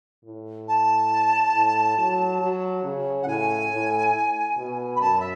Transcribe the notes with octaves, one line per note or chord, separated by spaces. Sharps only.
A2
A5
A2
F#3
F#3
C#3
F#5
A2 G#5
A2
B2
B5
F#2 A5
E5